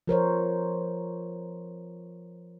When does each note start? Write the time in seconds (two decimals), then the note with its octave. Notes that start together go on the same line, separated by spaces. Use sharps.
0.07 F3 A#4 C5 C#5